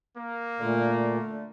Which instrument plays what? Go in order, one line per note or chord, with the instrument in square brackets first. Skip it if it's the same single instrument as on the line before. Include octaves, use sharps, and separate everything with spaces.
[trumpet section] A#3
[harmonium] A#2 [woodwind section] D3 A3